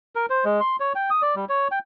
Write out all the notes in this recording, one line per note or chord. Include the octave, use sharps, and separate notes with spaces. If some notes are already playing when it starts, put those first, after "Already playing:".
A#4
C5
G#3
C6
C#5
G5
D#6
D5
G3
C#5
G5